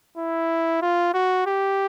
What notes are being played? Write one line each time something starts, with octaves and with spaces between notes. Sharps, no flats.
E4
F4
F#4
G4